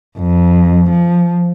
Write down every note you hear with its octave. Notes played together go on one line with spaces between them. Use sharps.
F2
F3